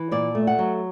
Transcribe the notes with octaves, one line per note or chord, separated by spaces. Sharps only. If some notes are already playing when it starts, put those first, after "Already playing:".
Already playing: E3
A#2 D5
A3
F#5
F#3